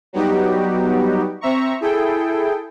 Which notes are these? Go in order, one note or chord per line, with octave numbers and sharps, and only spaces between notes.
F#3 G3 B3 D#4 F#4 G4
C4 E5 A#5 C#6
E4 G#4 A4 G5